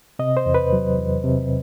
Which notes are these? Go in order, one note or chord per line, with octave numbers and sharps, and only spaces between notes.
C3 D#5
C5
E2
B4
F#3
E2
C3